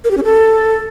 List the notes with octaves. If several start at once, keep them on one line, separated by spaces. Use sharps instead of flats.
A#4
G4
C#4
A4